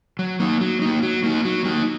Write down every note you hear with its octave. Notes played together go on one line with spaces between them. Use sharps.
F#3
A#3 D#4
F#3
A#3 D#4
F#3
A#3 D#4
F#3
A#3 D#4